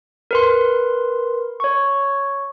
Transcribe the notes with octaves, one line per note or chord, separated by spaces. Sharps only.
A#4 B4 C6
C#5 C#6